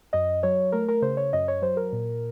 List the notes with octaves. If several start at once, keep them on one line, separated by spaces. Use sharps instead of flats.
F#2 D#5
F#3 C#5
A3 A#4
A#4
C#3 C5
C#5
F#2 D#5
C#5
F#3 C5
A#4
A#2